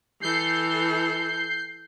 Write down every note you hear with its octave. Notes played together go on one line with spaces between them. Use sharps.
E3 A4 G6 C7